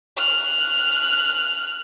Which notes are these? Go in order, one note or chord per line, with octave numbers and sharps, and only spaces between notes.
F6 F#6